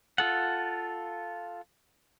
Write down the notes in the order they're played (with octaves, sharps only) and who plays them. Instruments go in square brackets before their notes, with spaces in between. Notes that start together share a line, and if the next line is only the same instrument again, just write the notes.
[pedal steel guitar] F4 A4 F#5